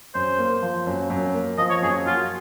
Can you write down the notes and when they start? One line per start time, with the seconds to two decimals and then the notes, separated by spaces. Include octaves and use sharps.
0.14 F#2 C5
0.38 A#3
0.62 F3
0.87 F#2
1.10 F#2
1.34 A#3
1.58 F3 D#5
1.70 C#5
1.82 F#2 G#4
2.06 F4 F#4